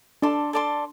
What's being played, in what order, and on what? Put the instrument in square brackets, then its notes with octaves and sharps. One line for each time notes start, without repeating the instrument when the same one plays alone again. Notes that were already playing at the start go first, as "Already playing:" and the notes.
[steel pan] D4 [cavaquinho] A4 D5 A5 C6
[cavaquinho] A4 D5 A5 C6